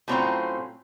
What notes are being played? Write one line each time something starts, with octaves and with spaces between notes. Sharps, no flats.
A2 F#3 C4 C#4 F4 A#5